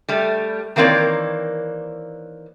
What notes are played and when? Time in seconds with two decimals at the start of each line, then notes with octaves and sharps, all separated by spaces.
0.09 G3 A3
0.76 D#3 E3 A#3 C4 C#5 D5